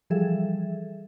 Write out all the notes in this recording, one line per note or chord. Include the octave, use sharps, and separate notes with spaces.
E3 F3 G3 G#4 A4 E5